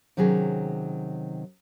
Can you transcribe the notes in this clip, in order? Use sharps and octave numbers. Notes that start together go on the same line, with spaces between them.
C3 D#3 F#3 C#4 G#4